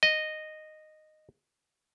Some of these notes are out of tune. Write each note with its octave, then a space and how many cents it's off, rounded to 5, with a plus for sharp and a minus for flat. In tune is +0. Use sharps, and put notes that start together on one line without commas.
D#5 -10